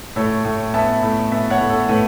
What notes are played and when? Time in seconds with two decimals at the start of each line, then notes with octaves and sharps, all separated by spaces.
0.16 A2 A4 C#5
0.45 A2
0.74 B3 E5 A5
1.03 A2
1.32 B3 E5 A5
1.50 C#5 F#5
1.61 A2
1.70 A4
1.89 A2 B4